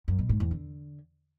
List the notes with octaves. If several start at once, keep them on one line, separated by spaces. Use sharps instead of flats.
F#2
B2
G#2
E2
D3